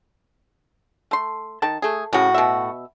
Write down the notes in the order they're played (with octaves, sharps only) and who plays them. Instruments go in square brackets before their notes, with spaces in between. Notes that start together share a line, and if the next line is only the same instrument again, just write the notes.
[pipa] A3 C6
D#3 A5
A3 G#4
[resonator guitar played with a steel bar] A2 F#4 [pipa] C#3 C#4
[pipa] B2 E5